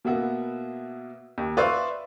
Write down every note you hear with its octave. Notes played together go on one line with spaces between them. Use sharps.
B2 A#3 B3 E5 F#5
D#2
B4 C5 D5 E5 F5 C#6